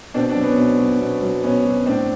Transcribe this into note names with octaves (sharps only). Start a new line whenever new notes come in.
B2 C4 D4
C4 D4
F#3
B3 C#4
B2
F#3
B2
F#3
B2 B3 C#4
F#3
C#4
A2 C4 D4